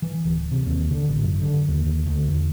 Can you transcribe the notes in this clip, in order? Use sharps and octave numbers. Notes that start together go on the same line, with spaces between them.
E3
D1
C3
D#2
D3
A1
F#2
D3
D#2
D2
E2